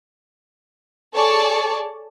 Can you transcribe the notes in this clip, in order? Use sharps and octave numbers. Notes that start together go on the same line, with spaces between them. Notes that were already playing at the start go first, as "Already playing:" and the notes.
G#4 A4 C#5 D5 A5 C#6